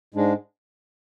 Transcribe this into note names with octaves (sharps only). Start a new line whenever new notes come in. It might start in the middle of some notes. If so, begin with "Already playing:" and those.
G#2 G#3 D4